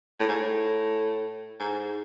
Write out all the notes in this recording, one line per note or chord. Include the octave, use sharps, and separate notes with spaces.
A2
G#2
A2
G#2